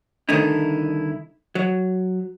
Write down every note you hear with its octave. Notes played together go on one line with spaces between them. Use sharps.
C2 D3 D#3 A3 D#4 E4
F#3